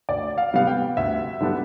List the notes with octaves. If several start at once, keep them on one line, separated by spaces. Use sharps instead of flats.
D2 D5
F5
C3 G3 B3 F5
G5
D2 E5
D3 G3 B3 D4